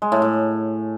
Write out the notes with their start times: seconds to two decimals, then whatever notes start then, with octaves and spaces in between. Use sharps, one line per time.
0.02 G#3
0.12 A2
0.22 A2